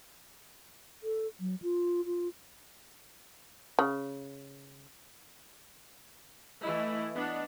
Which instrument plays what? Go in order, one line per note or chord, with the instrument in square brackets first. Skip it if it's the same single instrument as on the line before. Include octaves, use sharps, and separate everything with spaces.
[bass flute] A4
F#3
F4
F4
[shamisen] C#3
[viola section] E3 A3 E4 [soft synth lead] D#5
[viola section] B3 D4